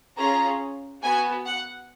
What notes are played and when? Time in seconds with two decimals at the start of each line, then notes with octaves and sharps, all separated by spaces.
0.19 C#4 F4 G#4 A#5
1.03 B3 F#4 G#5
1.45 F#5